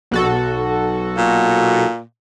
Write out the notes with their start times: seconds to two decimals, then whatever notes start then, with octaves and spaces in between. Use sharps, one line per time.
0.11 B1 F#4 A4
1.17 A#2